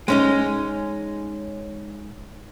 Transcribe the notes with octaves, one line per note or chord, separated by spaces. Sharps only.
G#3 C#4 D#4